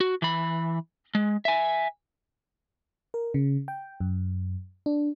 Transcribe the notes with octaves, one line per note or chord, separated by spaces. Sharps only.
F#4
E3 B5
G#3
E5 G#5
A#4
C#3
G5
F#2
D4